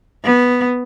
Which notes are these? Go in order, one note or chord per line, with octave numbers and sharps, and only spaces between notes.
B3